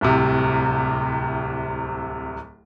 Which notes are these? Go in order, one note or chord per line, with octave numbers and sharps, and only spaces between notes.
D1 C2 C3